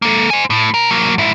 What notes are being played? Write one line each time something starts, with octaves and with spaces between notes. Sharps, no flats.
A#3 A4
C5 G#5
A2
B2 A#4
F#3 A#3
G#2 E4